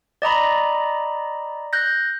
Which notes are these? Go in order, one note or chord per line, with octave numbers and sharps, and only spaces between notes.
D5 D#5 A#5 B5
F#6 G6 A#6